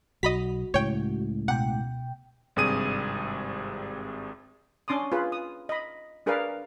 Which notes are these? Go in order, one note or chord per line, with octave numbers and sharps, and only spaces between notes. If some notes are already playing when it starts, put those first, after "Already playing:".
B1 F#4 D#5 B5 B6
C#2 A2 C#5 G5
B2 F#5 G5
G#1 G2 C3 G#4 D#6 D#7
C#4 D4 C6 D6 D#6
F4 G#4 B4
D#6
D#5 B5
D4 G#4 A#4 B4 D5 F5